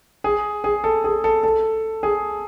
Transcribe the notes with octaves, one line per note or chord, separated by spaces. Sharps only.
G#4
G#4
A4
G#4
A4
A4
G#4